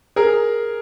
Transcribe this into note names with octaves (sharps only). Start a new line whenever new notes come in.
G#4 A#4